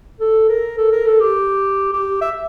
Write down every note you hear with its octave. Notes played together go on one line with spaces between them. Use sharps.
A4
A#4
A4
A#4
A4
G4
G4
E5